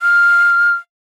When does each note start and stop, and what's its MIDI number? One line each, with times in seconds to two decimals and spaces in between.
0.02 0.74 89